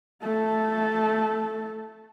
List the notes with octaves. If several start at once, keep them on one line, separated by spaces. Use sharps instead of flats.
A3 A4